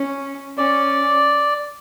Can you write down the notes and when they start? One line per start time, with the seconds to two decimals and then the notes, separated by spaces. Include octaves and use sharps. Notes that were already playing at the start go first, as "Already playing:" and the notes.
Already playing: C#4
0.58 C#4 D5